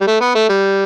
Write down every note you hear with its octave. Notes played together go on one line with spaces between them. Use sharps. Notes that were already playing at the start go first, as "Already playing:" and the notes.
G3
A3
B3
A3
G3